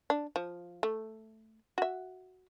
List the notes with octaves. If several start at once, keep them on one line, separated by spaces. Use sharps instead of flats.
D4
F3
A3
F#4 E5